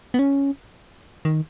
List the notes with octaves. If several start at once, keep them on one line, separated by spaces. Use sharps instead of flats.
B3
C#4
D#3